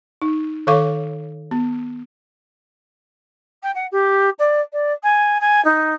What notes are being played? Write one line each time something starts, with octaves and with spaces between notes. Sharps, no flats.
D#4
D#3 A4 C#5 F5 C#6 D6
B3
G5
F#5
G4
D5
D5
G#5
G#5
D#4